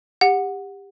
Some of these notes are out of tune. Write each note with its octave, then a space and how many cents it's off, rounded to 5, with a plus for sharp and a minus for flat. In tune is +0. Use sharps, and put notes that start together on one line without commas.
G4 +20 F#5 -10